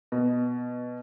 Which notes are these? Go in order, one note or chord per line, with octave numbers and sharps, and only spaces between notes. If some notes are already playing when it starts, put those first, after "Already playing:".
B2